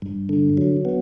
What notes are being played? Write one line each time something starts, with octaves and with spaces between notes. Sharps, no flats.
G2
D3
F#3
B3